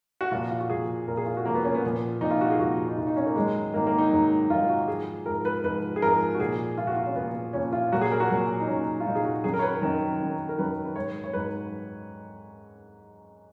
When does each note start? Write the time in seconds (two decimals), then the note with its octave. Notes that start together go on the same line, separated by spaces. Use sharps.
0.21 F#4
0.31 A#2 F3 F4
0.51 F4
0.60 F#4
0.70 A#2 F3 G#4
1.08 A#2 F3 A#4
1.17 G#4
1.26 F4
1.37 F#4
1.45 F3 A#3
1.49 A#2
1.55 B3
1.64 C#4
1.74 B3
1.83 A#2 F3
2.21 A#2 F3 D#4
2.31 F4
2.41 F#4
2.50 G#4
2.59 A#2 F3 F#4
2.89 D#4
2.98 A#2 F3 F4
3.07 D#4
3.16 C#4
3.26 A#3
3.36 G#2 D#3 F#3 G#3
3.74 G#2 D#3 F#3 A#3
3.87 A#3
3.98 D#4
4.11 G#2 D#3 F#3
4.50 G#2 D#3 F#3 F4
4.69 F#4
4.88 G#2 F3 G#4
5.25 G#2 F3 A#4
5.45 B4
5.64 G#2 F3 B4
5.96 G#4
6.02 G#2 F3 A#4
6.34 F#4
6.39 A#2 F3 G#4
6.78 A#2 F3 F4
6.87 F#4
6.97 F4
7.06 C#4
7.15 A#2 F3 B3
7.53 A#2 F3 C#4
7.73 F4
7.92 A#2 F#3 F#4
8.01 G#4
8.12 A#4
8.20 F#4
8.30 A#2 F#3
8.60 D#4
8.67 A#2 F#3 C#4
9.00 F4
9.07 A#2 F#3 D#4
9.15 G#4
9.25 F#4
9.44 F#2 D#3 F#3 G#4
9.54 A#4
9.59 C#5
9.63 B4
9.81 F#2 D#3 F#3
10.20 F#2 D#3 F#3
10.49 A#4
10.58 F#2 D#3 F#3 B4
10.85 B4
10.96 G#2 F#3 C#5
11.24 C#5
11.33 G#2 F#3 B4